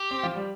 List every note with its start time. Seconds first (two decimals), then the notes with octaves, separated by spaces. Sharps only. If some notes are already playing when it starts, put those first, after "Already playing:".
Already playing: G4
0.11 C4
0.23 F3 F4
0.35 G3 G4